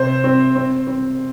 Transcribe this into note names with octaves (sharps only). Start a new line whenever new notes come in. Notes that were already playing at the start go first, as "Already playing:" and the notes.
Already playing: C3 C4 C5
C4
C4
C4